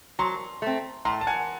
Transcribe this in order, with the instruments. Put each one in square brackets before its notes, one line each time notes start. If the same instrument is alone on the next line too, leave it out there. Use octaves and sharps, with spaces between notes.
[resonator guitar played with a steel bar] F#3 [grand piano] A#5 C6
[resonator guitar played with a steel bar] A3 C4
[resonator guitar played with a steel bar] A2 [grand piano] A#5 C6
[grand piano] A5
F#5 G#5